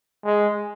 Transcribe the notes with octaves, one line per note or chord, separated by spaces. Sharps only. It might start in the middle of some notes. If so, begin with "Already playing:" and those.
G#3